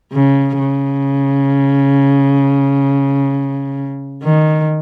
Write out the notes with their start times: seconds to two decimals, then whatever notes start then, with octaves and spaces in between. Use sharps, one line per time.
0.13 C#3
0.59 C#3
4.23 D#3